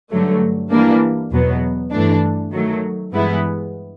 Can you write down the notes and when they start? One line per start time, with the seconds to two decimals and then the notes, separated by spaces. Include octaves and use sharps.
0.11 G2 D3 F#3 A3
0.71 E3 G3 A#3 D4
1.31 E2 B2 F#3 B3
1.91 G2 E3 A3 D4
2.51 D#3 F#3 A3
3.12 G2 E3 G#3 B3 E4